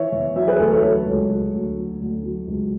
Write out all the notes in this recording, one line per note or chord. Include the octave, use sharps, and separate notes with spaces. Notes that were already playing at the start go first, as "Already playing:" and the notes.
Already playing: E3 C#5 E5
E2
F#3 C#5 E5
G#4 B4
D2 A4 C#5
A4 C#5
F#3 A4 C#5
C#2
F#3
D2
F#3
D2
F#3
C#2